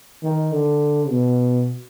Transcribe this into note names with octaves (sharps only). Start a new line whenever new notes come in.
D#3
D3
B2